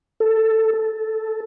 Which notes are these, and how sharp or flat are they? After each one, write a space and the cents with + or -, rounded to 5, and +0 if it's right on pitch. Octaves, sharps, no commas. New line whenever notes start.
A4 +10
A4 -5